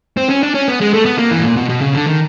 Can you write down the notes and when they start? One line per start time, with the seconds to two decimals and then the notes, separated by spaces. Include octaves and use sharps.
0.17 C4
0.30 C#4
0.43 D4
0.54 C#4
0.68 B3
0.81 G#3
0.94 A3
1.05 B3
1.18 A#3
1.31 E3
1.39 A2
1.43 A#2
1.56 B2
1.69 B2
1.81 C#3
1.94 D3
2.07 D#3